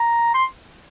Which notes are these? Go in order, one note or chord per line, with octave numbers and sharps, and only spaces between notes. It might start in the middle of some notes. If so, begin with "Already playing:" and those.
Already playing: A#5
C6